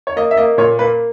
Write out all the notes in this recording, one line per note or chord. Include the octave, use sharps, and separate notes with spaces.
C#5
A#3 D#5
E5
A#3 D#5
A#2 C#5
A#3 B4